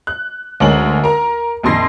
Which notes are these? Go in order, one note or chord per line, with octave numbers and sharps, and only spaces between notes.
F#6
D2 G#3 C#4 A#4 F#7
A#4 A#5
A#1 F2 D#3 C6 A#6 C7